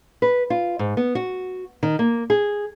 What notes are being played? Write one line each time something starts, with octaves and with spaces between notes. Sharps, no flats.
B4
F4
G#2
B3
F#4
D#3
A#3
G#4